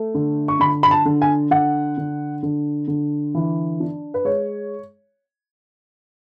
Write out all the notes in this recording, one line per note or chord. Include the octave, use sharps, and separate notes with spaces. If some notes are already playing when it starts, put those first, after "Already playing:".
Already playing: A3
D3
C#6
D3 B5
B5
A5
D3
G#5
D3 F#5
D3
D3
D3
E3
D4
B4
G#3 C#5